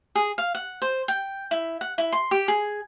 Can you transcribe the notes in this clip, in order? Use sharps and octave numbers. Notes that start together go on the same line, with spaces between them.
G#4
F5
F#5
C5
G5
E4
F#5
E4
C6
G4
G#4